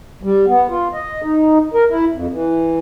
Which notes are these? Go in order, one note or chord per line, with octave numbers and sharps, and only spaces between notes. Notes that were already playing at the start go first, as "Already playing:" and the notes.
G3
B3
F4
D#5
D#4
A#4
E4
F2
E3